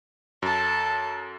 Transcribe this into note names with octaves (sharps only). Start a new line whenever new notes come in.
F#2 A4 A5